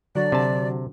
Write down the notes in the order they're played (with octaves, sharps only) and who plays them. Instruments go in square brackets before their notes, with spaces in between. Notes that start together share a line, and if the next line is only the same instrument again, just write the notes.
[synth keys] D3 F#3 [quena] D5
[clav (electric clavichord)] C3 A5